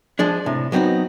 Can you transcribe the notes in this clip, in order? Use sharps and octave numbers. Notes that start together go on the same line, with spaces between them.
F3 G#3 D4
A2 C3
F#3 B3 C4 D4 D#4